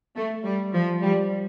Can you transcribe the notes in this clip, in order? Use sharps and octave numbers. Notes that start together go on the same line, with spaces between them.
A3
G3
F3
G3